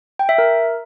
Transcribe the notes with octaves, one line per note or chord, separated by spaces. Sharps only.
G5
E5
A#4